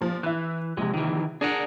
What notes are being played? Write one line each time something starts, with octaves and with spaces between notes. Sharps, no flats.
A#2 F3
E3 E4 F#6
A#1 C3 G#3
D#3 E3
D4 G#4 A#4 F#5